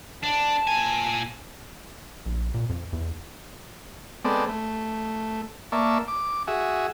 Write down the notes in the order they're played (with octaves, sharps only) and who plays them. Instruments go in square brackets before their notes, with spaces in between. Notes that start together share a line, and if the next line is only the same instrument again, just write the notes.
[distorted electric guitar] D4 [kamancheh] A5
[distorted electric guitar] A#2 G#5
[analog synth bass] A#1
A#2
F2
E2
[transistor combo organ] G#3 B3 C4 A4 D5
A3
A#3 D5 E5 A5 C#6
D6
F#4 G#4 E5